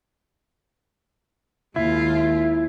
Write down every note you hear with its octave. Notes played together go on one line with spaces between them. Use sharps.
D#2 G#3 E4 F4 E5